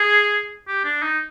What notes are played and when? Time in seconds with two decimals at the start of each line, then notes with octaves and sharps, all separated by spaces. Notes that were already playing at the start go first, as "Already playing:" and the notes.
Already playing: G#4
0.68 G4
0.85 D4
1.03 D#4